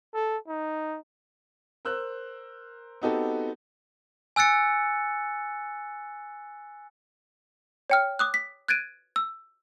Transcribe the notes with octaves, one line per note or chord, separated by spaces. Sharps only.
A4
D#4
A#4 C5 E6 F#6
B3 C4 D#4 F#4 G4 A4
G#5 E6 F#6 A6 C#7
C#5 G5 F6
D6 D#6 F#6
B6
F#6 G#6 A6 D7 D#7
E6